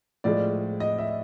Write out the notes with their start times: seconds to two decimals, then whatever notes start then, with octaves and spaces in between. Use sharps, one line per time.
0.24 A2 F3 G#3 D5
0.80 D#5
0.99 E5